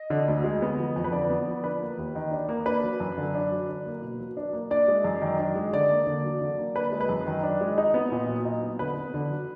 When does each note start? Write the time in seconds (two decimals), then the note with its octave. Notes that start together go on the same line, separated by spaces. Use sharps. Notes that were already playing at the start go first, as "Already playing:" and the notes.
Already playing: D#5
0.10 D3
0.28 D2
0.44 G#3
0.62 B3
0.79 F3
0.96 F2
1.04 B4
1.12 D3 D5
1.29 B3
1.47 F3
1.64 D4 B4
1.80 A#3
1.98 D#2
2.15 D#3
2.31 D4
2.49 A#3
2.66 D4 B4
2.83 F#3
3.00 F#2
3.18 D3
3.35 D4
3.51 F#3
3.69 D4
3.86 A#3
4.02 B2
4.19 F#3
4.37 D4
4.53 A#3
4.71 D4 D5
4.88 G#3
5.04 F#2
5.22 D#3
5.39 D4
5.55 G#3
5.73 D3 D5
5.90 A#3
6.07 D3
6.24 F#3
6.41 D3
6.58 A#3
6.76 D4 B4
6.92 G#3
7.01 B4
7.09 F#2
7.26 D#3
7.43 D4
7.61 G#3
7.78 D#4
7.94 B3
8.12 A#2
8.28 F#3
8.45 D#4
8.62 B3
8.79 D3 B4
8.97 B3
9.14 D3
9.30 F#3